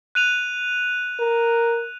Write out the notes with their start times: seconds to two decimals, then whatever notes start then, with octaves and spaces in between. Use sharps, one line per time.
0.15 F#6 D#7 F7
1.19 A#4